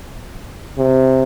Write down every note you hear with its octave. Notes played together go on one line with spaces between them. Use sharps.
C3